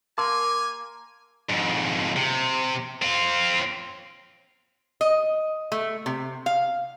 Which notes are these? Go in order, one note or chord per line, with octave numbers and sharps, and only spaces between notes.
A#3 G#5 A5 C6 D6 E6
F2 G#2
C3
C4 F4
D#5
A3
C3
F5